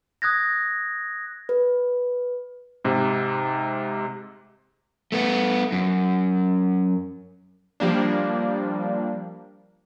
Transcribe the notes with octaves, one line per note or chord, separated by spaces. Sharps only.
D#6 F#6 G#6 A#6
B4
G#2 C3
A3 B3
F#2
F3 G3 A#3 D4